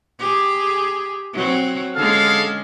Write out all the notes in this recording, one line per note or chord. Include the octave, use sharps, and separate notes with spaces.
G4 G#4
F#3 C4
D3 G#3 C#4 G#4 A4 F5